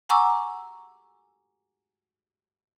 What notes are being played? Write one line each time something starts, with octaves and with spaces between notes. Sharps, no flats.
F#5 G#5 A#5 C#6 D6 E6